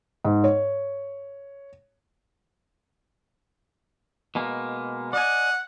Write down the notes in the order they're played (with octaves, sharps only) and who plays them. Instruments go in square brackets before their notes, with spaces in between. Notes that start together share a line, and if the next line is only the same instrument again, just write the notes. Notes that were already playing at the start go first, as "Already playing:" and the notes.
[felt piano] G#2
C#5
[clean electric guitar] B2 G#3 A#3
[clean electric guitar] D5 D#5 G#5 [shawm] F#5